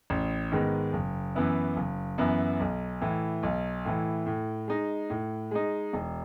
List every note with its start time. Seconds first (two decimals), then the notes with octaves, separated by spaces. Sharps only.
0.10 A1
0.52 G#2 D#3 G#3 B3
0.93 F#1
1.35 F#2 E3 B3 E4
1.76 F#1
2.18 F#2 E3 B3 E4
2.60 B1
3.01 A2 E3
3.43 B1
3.85 A2 E3
4.26 A2
4.68 G#3 D#4
5.10 A2
5.51 G#3 D#4
5.93 E1